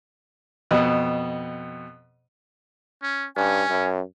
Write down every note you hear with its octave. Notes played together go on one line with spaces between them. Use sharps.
F2 B2
C#4
G2 C#4 G#5
F#2